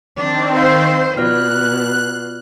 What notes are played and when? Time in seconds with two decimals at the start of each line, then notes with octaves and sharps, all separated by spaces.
0.16 D#3 C4 D4
0.55 C5 D#5 F5 E6
1.17 B2 F4 D5 F6 F#6